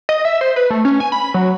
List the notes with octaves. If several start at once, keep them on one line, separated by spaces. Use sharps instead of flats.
D#5
E5
C5
B4
A3
C#4
G#5
B5
F#3